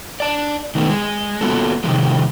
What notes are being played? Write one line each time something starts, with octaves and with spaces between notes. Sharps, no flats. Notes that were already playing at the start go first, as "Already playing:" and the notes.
D5 A5
D#3 A3 B3
G#3
A#3 B3 F4 F#4 A4
C3 D#3 F3 G#3